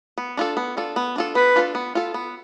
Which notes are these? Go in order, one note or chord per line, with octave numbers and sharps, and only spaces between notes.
B3
D4 F4 A4
B3
D4 F4 A4
B3
D4 F4 A4
B3 B4
D4 F4 A4
B3
F4 A4
B3